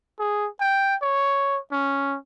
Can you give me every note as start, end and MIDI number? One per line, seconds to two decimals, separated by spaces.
0.19 0.48 68
0.60 0.95 79
1.02 1.58 73
1.72 2.17 61